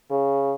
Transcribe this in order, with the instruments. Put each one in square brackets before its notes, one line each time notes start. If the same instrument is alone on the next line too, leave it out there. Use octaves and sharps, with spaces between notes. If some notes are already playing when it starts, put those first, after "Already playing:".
[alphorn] C#3